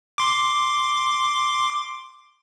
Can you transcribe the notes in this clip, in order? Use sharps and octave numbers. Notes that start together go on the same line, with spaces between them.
C6 D6